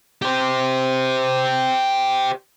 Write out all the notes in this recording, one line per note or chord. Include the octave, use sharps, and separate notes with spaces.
G4 C5